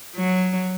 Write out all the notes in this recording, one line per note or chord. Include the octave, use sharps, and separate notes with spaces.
F#3